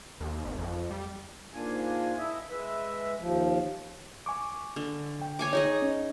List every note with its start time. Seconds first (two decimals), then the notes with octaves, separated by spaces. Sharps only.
0.21 D#2
0.45 G#1
0.58 F2
0.90 G3
1.54 G#2 A#3 D4 F4 G#5
2.18 E4 D#5 E5
2.50 G#3 B4 E5
3.19 D#2 F3
4.26 G#5 C#6 D6
4.76 D3
5.22 G5
5.39 C#5 G#5 D6
5.53 D#4 G#4 C#5 D#5
5.82 C#4